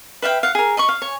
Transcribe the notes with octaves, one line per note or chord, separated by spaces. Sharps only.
B4 E5 F5 G5
F5 F#5
G#4 A#4
D#5 B5 C#6
F5
C#5 G#5